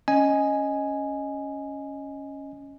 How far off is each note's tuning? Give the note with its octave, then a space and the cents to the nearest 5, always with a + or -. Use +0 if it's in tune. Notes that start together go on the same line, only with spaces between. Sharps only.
C#4 +0 D#5 +0 G#5 +0